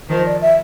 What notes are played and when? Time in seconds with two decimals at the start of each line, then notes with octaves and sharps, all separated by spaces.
0.09 D#3 F3 C5
0.26 D5
0.41 E5